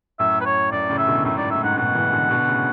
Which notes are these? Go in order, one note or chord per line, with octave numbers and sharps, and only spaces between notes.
F#2 A2 E5
B4
C#5
F#2 D5
A2 C#3
E5
B2 D3
F#2 A2 E5
G#2 D5
A2 E5
G#2 F#5
G#2 B2 F#5
C#3 E3
B2 D3
B2 D3
A2 C#3